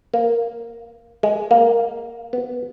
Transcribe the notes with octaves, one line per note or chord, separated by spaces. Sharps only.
A#3
G#3
A#3
B3